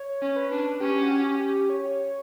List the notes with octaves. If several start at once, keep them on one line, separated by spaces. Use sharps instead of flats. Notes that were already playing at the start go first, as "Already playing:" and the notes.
Already playing: C#5
C#4
B4
D4
C#4 G4
F#4
G4
G4
C#5